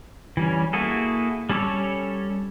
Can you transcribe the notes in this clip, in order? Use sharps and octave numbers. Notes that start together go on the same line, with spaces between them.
E3 G3 C#4
A#3 E4 F#4 G#4 A4
G3 C#4 A4 C#5 D6